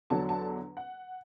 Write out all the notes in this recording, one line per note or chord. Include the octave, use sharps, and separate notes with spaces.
E2 D3 F#3 D4 A5
A5
F#5